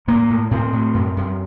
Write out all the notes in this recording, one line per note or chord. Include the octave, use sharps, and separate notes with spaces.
A2 A#3
A2
A2 C4
A2
F#2
F#2